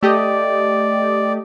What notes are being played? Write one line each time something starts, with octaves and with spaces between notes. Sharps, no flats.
A3 G4 D5 D#5